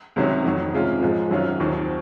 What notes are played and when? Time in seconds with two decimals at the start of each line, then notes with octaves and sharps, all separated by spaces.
0.16 C#2 C3 D#3 F#3 C#4
0.45 F2 D#3 F#3
0.73 C3 D#3 G#3 C#4 F4
1.02 G#2 F3 G#3 D#4
1.31 F#2 D#3 F#3 C#4 F4
1.60 D#2 D#3 F#3 C4